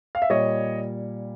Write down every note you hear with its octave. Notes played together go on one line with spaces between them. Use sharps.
F5
E5
A#2 G3 C#5 D#5